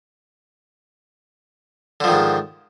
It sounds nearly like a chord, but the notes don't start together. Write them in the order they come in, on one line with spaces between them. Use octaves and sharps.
D3 F3 D#3 G#2